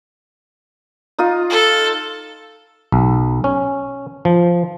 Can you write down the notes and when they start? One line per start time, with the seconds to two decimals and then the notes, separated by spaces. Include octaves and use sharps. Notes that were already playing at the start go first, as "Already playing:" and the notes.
1.18 D#4 F4 D#5
1.50 A4
2.92 B1
3.44 C#4
4.25 F3